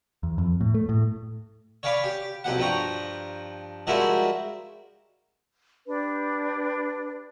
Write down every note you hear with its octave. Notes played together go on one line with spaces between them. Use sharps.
E2
F2
A2
A3
A2
C#5 D5 F5 G#5 B5 D6
G4
B1 F2 G4 F#5
G2 F3 G5 A#5 C#6
F3 G3 G#3 E4 F#4 A#4
D4 G4 B4